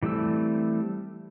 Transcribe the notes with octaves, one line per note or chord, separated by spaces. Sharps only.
E3 G3 A3 C4 E6